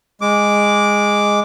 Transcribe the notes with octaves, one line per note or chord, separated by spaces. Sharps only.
G#3 D6